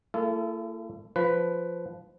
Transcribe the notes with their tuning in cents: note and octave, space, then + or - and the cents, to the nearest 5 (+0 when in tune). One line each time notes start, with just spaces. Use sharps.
A#3 -45 E4 +45 A4 -20
F3 +0 B4 +10